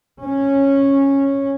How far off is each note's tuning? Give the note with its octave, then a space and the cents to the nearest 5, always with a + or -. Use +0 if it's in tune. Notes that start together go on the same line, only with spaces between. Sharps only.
C#4 -10